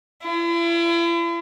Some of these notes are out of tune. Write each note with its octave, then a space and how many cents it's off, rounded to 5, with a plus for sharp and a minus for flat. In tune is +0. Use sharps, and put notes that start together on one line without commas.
E4 +45